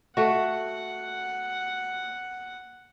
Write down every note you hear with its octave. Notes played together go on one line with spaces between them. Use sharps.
A3 F#4 F#5